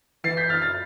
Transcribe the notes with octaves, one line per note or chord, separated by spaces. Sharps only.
E3 A6 C7
G6 B6
F6 A6
F6 A6